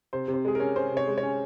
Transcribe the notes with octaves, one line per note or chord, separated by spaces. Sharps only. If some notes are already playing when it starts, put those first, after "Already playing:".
C3 C5
C3
C5
G#3 G#4
C#4 A#4
C#4 C5
C3
C#5
G#3
C#5
C#4